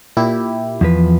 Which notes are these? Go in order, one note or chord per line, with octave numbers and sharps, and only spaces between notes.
A#2 E4 G4
E2 F3 B4